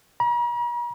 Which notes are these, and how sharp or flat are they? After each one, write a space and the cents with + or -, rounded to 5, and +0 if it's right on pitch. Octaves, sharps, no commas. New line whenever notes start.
A#5 +45